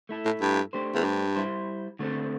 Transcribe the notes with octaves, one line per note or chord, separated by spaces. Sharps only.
A3 E4 A4
A2
G2
A3 D4 G4 C5
E2
G2
G3 E4 C5
D3 A3 C4 A4